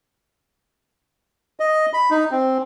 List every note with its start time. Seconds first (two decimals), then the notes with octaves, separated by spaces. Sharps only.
1.60 D#5
1.93 B5
2.11 D#4
2.31 C4